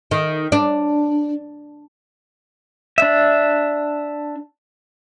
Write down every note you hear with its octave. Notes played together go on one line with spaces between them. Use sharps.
D#3
D4
D4 E5